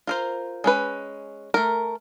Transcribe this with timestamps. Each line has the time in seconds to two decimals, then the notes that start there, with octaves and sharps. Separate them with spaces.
0.07 F4 A#4 C5
0.64 G#3 C#4 B4
1.54 A3 A#4